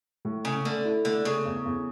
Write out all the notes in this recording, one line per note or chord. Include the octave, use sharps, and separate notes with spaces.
A2
C#3 C#4
D3 A3
E4
D3 A3
C#3 A3
E2
E2